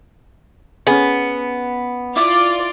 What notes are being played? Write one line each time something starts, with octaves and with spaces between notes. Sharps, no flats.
B3 C#4 G#4
E4 F4 D5 E5 D6